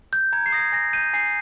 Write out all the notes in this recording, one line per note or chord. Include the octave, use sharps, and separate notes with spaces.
G6
A#5 G#6
C7
D#6 A#6
G#6
G#5 A#6
G6 D#7
G#5 C7